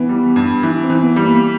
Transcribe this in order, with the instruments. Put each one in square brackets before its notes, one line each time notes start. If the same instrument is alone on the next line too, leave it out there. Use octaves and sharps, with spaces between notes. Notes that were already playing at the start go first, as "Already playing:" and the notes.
Already playing: [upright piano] E3 [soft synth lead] B3
[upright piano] G3
G2
E3
[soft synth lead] C4
[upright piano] E3
[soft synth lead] B3
[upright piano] G3
[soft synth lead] A#3